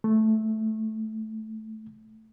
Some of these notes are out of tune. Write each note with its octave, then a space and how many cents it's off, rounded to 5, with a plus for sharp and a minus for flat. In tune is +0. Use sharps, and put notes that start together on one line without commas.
A3 -5